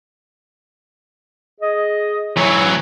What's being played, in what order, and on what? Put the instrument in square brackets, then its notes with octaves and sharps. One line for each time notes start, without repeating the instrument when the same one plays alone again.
[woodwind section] G#4 D#5
[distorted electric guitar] E3 F#3 [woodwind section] C#5